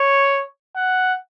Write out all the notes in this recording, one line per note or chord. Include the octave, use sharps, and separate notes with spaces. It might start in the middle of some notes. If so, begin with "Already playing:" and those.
Already playing: C#5
F#5